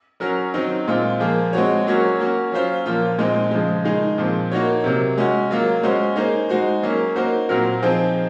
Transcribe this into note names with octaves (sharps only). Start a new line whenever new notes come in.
F#3 C#4 F#4 A#4
D#3 F#3 C4 D#4
A#2 G#3 C4 F4
F3 A#3 F4 G#4
G#3 C4 F#4 C#5
F#3 A#3 C#4 F#4 C#5
A#3 C#4 F#4
F#3 C#4 F4 C5
A#2 F3 A#3 F4
A#2 G#3 C4 D#4
C#3 F3 G#3
D#3 G#3 D#4 G#4
A#2 F3 C4
A#3 D#4 F#4 C#5
C3 F#3 A#3
G#3 C#4 F#4
F#3 A#3 F4
G#3 C#4 F#4 C5
A#3 D#4 G#4 C5
G#3 D#4 F#4 C5
F#3 A#3 C#4
A#3 D#4 F#4 C5
A#2 F#3 C4 F#4 A#4
F3 C4 D#4 G#4 C5